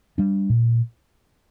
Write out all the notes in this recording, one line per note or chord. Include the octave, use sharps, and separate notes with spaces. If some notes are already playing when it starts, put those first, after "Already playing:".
G3 D4
A#2